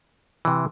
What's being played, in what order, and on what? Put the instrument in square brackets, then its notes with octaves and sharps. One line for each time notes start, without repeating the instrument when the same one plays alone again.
[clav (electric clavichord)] C3 E3